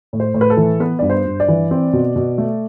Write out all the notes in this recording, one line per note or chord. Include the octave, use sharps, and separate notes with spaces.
A2
C5
A2
B4
A4
E3
B3 B4
G2 D5
C5
G2
D5
E3
C4
B2
B2
A3